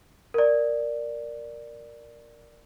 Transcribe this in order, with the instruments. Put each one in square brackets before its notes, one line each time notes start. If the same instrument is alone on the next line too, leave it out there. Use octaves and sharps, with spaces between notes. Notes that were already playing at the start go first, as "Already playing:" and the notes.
[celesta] A#4 D5